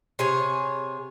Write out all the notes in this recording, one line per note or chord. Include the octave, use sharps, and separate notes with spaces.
C3 G#4 C#5